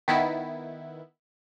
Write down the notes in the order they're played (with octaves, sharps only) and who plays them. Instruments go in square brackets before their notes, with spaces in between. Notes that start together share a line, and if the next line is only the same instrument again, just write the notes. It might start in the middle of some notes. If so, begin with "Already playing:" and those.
[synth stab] D#3 B3 E4